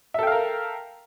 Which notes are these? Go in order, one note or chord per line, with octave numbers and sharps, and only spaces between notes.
A4 A#4 E5 F5 G5